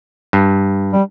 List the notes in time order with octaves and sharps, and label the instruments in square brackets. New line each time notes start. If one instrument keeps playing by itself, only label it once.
[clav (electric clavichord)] G2
[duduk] G3